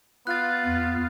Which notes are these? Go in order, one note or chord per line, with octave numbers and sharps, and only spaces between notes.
B3 F4 F#6 A6
E2